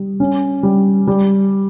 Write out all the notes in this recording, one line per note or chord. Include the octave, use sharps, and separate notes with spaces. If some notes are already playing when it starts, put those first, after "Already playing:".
Already playing: G3
C#4
G3
G3